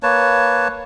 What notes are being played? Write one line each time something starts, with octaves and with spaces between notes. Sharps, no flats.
A#3 B4 C#5 A5